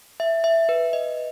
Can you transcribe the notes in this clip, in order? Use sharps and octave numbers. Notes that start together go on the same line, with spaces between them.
E5
E5
B4
D#5